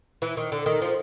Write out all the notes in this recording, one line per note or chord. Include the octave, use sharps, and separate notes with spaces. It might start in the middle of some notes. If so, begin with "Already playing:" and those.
E3
D#3
D3
D#3
F3